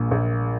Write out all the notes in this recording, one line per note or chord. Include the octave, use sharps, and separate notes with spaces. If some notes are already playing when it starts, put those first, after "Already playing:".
Already playing: A#1 A#2
A#1